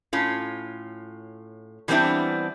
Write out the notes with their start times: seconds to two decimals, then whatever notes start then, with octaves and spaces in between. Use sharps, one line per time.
0.13 A2 C#4 F4
1.88 E3 G3 B3 C4 D4 E4